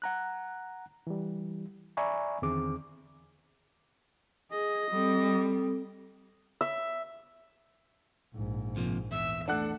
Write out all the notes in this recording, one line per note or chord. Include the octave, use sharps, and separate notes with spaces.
F#5 A#5 F#6
E3 G3
D5 E5 G#5 A#5 B5 C#6
E2 D3 D#3 C4 G#4 D6
G#4 D#5
G3 C4 A4 D#6
E5
A#1 G#2
C3 F3 A#3
E2 E5
A3 D4 A4 F#5 F#6